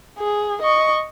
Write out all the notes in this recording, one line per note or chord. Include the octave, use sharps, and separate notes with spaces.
G#4
D#5 C#6